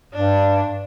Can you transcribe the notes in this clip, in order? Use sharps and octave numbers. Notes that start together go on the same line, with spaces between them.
G2 D4